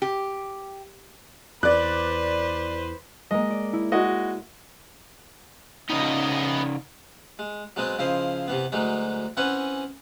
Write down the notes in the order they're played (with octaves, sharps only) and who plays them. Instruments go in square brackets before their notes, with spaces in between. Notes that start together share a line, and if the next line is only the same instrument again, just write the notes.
[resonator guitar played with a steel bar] G4
[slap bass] E2 [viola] B4 C5 [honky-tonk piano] D5 F#6
[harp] G#3 A#3 [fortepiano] D#5
[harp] D5
E4
[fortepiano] G#3 F#4 D#5
[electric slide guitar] C#3 D#4 [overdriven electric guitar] B3 D#5
[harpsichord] G#3
F#3 G#3 B3 C4 D#5
C#3 F3 E4 C5 D#5
C3 E3 B3
D2 E3 F#3 G#3 D#4
E3 C4 C#4 B4 F#5 G#5